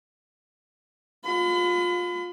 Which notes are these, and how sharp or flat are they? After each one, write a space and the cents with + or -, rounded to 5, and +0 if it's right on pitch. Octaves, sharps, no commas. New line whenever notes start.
F4 +25 B5 +40